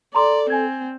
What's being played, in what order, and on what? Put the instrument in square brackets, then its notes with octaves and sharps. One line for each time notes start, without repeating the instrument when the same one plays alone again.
[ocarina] A4 [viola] D5 [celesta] A#5 C6 D6
[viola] C4 [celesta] G#5 G#6